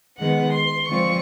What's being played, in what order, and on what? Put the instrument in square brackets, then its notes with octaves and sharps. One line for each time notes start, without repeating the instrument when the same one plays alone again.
[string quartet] D#3 G#3 B3 F#5
C6
D3 F3 G#3 C4 F4 C#6